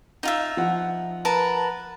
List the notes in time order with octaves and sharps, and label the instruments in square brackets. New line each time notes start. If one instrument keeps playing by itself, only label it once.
[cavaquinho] D#4 F4 E5
[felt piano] F3 F#5
[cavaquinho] A#4 B4 A5